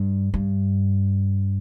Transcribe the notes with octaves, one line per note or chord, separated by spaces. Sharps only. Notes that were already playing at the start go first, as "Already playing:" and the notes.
Already playing: G2
G2